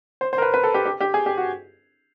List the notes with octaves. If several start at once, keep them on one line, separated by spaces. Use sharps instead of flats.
C5
C5
A#4
B4
B4
A4
G4
G4
G4
G#4
G4
F#4